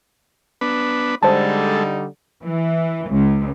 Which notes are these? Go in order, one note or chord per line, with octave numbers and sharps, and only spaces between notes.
B3 D4 B4
D3 G3 G#3 D#4 A4 C5 A5
E3
C#2